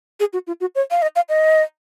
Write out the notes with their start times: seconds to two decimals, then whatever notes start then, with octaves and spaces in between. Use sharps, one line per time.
0.20 G#4
0.33 F#4
0.47 F4
0.61 F#4
0.75 C#5
0.91 F5
1.02 D#5
1.16 F5
1.29 D#5